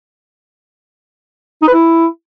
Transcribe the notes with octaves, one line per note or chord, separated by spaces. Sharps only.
D#4
B4
E4